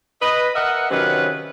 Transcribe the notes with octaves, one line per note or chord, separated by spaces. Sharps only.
B4 D#5
A#4 D#5 E5 F#5
C3 D#3 F#3 C#4 F4 B4